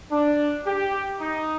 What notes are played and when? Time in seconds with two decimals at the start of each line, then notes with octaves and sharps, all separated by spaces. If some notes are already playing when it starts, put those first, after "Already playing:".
0.11 D4
0.66 G4
1.20 D#4